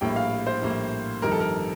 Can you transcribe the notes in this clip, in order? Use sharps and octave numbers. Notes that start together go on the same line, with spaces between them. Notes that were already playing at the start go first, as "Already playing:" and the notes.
A#1 A2 G3 A#3 G5
F5
C5
A#1 A2 G3 A#3
G1 F2 D#3 G3 A#4
A4
A#4